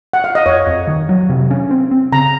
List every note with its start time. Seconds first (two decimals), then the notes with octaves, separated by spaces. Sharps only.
0.13 F#5
0.24 F5
0.35 D#5
0.46 F2 C#5
0.67 F2
0.87 D#3
1.09 F#3
1.29 C3
1.51 C#4
1.71 C4
1.91 C4
2.12 C#3 A#5